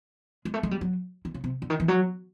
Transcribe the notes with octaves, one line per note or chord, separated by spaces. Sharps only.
G#3
A3
G#3
G3
F#3
D#3
C#3
C3
D3
D#3
E3
F#3